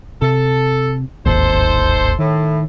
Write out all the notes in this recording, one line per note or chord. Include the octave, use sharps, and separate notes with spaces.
C3 A4
D1 G#1 D#2 D#4 A4 C5
A2 D#3